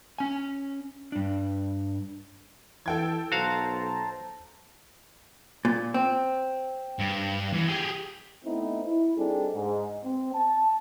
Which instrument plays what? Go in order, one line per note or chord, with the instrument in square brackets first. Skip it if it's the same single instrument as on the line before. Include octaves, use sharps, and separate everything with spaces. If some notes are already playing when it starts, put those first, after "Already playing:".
[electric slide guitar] C#4 G#5
G2 D4
[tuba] E3 [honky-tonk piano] A4 G5 G#6
[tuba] B1 [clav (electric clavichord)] F#4 F5 [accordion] C5 A5 A#5
[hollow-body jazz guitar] A#2
C4
[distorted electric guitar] G2
E2
G4 G#4
[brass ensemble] A3 B3 C4 D#4 E4
E4
G3 C4 D4 D#4 G#4 A4
G#2
C4
A5